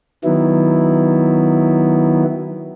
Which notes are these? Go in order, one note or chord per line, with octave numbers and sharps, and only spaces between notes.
D#3 F#3 B3 E4